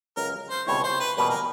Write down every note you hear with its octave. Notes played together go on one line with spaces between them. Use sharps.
C#2 C#3 F#3 A#4
C5
C#2 B2 G3 C4 E4 C#5
C5
B4
E2 B2 G3 A#3 C#4 B4
A#4